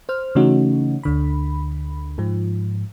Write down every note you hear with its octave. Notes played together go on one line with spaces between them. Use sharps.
C5 F6
C#3 E3 A3 C#4 D#4 F#4
D2 D3 B5
G#2 F3